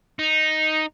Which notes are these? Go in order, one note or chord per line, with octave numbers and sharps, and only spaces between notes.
D#4